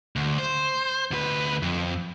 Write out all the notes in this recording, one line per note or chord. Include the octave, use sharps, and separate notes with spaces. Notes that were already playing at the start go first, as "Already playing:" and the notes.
D2
C5
D2 B4
F2